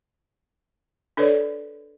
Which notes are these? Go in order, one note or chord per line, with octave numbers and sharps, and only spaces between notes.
D4 A4 B4 C#5 D5